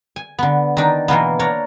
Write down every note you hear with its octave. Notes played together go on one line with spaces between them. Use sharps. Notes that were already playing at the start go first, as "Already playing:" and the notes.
G#5
D3 B3
D#3 D4 D#4
B2 E3 A#3 B3
D4 A#4 C#5